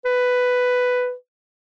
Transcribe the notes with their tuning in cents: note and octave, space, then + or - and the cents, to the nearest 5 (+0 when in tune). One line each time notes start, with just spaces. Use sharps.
B4 +5